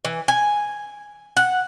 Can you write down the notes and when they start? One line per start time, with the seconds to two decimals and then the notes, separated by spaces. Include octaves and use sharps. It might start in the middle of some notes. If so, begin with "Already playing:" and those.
0.05 E3
0.28 G#5
1.37 F#5